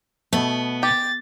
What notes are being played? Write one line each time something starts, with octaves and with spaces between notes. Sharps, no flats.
B2 A3 B3
G4 A6